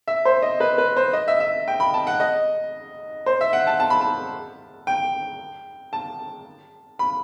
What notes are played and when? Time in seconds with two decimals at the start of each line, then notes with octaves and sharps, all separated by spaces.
0.08 E5
0.25 C5
0.42 D#5
0.60 B4
0.78 B4
0.97 C5
1.13 D#5
1.28 E5
1.40 E5
1.68 G5
1.80 B5
1.94 A5
2.07 F#5
2.20 D#5
3.26 C5
3.41 E5
3.53 F#5
3.67 A5
3.80 A5
3.90 B5
4.01 A5
4.87 G5
5.93 A5
6.99 B5